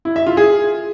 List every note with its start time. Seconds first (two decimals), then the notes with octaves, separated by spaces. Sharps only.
0.05 E4
0.16 E5
0.27 F4
0.37 G#4